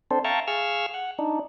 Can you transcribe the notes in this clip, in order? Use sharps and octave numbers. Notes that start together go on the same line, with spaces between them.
C4 D4 A4 C5
E5 F5 G5 A5 A#5 C#6
G#4 F5 C#6 E6 F6
F#5
D4 D#4